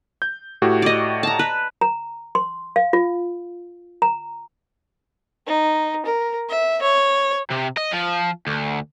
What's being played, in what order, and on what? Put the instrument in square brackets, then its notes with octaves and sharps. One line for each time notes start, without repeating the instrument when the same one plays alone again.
[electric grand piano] G6
A2 F#4 G4
[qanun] D5 D#5
A5 A#5
B4
[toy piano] A#5
C6
F5
F4
A#5
[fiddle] D#4
A#4
E5
C#5
[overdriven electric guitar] C3
D#5
F3
D2